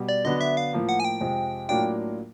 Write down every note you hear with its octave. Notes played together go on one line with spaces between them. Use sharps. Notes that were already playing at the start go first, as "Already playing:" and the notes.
Already playing: B2 G3
D5
D3 F#3 B3 D4 D#5
E5
F5
A2 F3 A#3
F#5
G#5
G5
F2 C3 F3 G#3
A2 F#3 A#3 D4 F4 G5